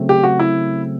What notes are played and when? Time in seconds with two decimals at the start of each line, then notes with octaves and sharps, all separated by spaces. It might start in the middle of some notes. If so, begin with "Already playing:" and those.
Already playing: C#3 F#3 A3 C4
0.09 G4
0.23 F#4
0.39 E4